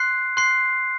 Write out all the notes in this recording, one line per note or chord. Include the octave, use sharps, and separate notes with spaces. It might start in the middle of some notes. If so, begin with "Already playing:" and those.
Already playing: C6 F#6 C7
C6 F#6 C7